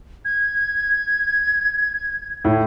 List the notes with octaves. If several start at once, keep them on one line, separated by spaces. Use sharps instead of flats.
G#6
A2